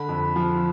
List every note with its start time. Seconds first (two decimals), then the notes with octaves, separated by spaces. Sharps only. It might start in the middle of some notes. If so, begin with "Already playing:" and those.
Already playing: D3 B5
0.09 F2
0.36 F3